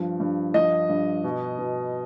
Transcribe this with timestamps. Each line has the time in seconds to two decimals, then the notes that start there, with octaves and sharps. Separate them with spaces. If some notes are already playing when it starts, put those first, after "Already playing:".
Already playing: G2 F3
0.20 G2
0.54 F3 D#5
0.89 G2
1.24 B2
1.59 B2